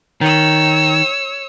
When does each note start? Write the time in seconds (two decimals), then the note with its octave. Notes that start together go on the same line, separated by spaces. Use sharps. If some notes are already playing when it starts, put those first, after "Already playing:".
0.21 D#3 C#5 E6